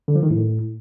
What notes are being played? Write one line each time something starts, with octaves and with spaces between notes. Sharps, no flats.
D3
F3
D#3
A2